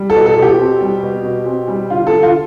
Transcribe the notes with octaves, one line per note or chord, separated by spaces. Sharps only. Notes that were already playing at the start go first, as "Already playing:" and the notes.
Already playing: G3
A4
B2
A4
B2
G4
C4
G3
B2
B2
C4
G3
D3 F4
A4
D3
F4